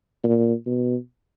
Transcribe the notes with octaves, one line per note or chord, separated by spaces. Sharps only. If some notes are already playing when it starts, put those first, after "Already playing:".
A#2
B2